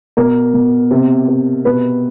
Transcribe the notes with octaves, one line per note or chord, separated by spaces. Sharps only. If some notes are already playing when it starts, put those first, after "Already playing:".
B2 A#4
B2
C3
C3
B2 B4